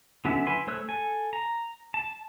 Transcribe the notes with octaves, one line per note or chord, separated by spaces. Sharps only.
D3 F#3 B3 C#4 E5
E4 B4 G#5 C6
A3 C5 C#5 E6 F#6
A4 G#5
A#5
A5